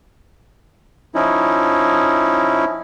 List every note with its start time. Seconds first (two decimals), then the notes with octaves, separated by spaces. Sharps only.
1.15 F3 C#4 D#4 E4